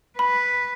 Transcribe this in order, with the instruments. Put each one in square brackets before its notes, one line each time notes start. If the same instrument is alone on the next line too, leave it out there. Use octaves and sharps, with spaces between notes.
[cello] B4 [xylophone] B5